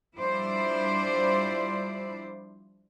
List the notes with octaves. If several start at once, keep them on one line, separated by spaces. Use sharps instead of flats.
F3 G3 D4 E4 C5 D5